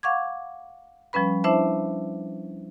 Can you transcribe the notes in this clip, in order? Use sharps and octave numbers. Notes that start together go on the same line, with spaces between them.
F5 F#5 C#6 D6 G#6
F3 G3 C#4 B4 B5
D4 E4 C5 E5 A5